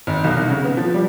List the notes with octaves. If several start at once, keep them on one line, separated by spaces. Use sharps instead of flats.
G#1
B1
C2
C#3
B3
F3
G3